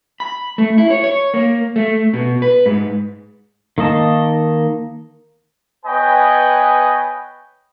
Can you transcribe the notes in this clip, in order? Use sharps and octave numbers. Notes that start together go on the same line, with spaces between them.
B5
A3
E4
C#5
C#5
A#3
A3
B2
B4
G#2
D#3 A#3 D#5 A5
B3 B4 C#5 D#5 G5 G#5